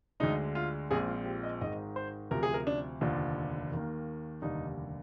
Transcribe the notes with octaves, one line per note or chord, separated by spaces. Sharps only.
D2 D3 G#3 D#4
F4
A#1 A#2 G#3 C4 G#4
F4
G4
D#5
G#1 G#2 D#3 G#3 D#5
C5
D2 C3 F3 A#4
G#4
A#4
D4
F1 D#2 D3 F3
D#2 D#3 A#3
F1 D#2 D3 G3 D#4